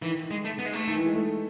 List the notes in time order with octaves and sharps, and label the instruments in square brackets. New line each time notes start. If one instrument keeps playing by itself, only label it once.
[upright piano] D#3 [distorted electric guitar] E3
[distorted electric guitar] G#3
A3
B3
G#3
A3
[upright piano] D#3
E3
G#3
A3